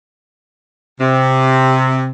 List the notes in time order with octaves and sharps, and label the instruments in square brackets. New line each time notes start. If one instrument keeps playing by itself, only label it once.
[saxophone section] C3